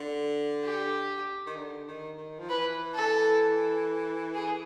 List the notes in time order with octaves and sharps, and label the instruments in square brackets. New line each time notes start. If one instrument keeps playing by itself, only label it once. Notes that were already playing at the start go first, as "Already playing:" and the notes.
Already playing: [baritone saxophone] D3
[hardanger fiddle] G4
[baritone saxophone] D#3
D3
D#3
D#3
F3
[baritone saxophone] E3 [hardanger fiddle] B4
[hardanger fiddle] A4
G#4